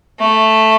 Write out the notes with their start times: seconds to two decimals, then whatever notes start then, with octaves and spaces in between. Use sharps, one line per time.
0.19 A3